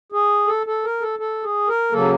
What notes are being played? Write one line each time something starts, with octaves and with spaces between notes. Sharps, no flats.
G#4
A4
A4
A#4
A4
A4
G#4
A#4
C#3 F#3 A#3 A4